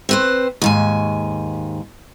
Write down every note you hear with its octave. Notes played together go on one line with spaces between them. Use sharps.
C4 B4 C5
D#2 G#2 G#5